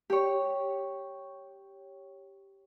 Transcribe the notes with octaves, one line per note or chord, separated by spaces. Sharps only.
G4 C#5